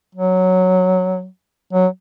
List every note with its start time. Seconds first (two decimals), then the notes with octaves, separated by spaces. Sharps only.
0.15 F#3
1.73 F#3